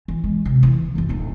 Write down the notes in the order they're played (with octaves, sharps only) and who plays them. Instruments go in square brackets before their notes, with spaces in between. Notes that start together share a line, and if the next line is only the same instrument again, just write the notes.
[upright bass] E3
G#3
C3
E3
B1 F#2
D1 D#4